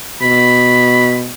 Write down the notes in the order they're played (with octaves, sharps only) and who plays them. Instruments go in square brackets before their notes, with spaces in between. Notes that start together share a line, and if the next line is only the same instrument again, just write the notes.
[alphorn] B2 [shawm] B5